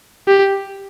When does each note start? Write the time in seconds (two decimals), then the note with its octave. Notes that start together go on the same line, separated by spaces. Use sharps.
0.28 G4